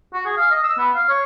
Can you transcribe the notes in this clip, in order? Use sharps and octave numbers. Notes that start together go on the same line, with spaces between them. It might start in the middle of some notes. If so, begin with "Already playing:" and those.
F#4
G#4
F5
D#5
E6
B3
F5
C#5